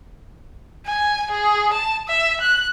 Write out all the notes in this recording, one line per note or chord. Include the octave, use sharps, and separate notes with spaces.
G#5
G#4
A5
E5
F#6